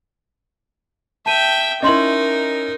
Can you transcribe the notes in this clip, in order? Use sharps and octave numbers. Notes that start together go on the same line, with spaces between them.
E5 G5 A5 D#7
C#4 D#4 E4 A#4 D#5 C6 F#7